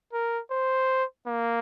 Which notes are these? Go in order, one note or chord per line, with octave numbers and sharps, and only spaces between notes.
A#4
C5
A#3